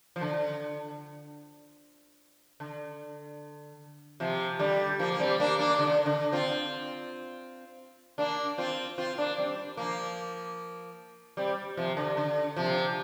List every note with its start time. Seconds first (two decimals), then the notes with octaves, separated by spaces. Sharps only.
0.16 F3
0.21 D3
2.60 D3
4.20 C3 F3
4.59 D3 G3
4.99 F3 A#3
5.12 A#3
5.20 G3 C4
5.40 A#3 D4
5.59 A#3 D4
5.79 D3
6.06 D3
6.32 C4 F4
8.18 A#3 D4
8.58 C4 F4
8.98 C4 F4
9.18 A#3 D4
9.38 G3 C4
9.77 F3 A#3
11.37 G3 C4
11.77 C3 F3
11.97 D3
12.17 D3
12.56 C3 F3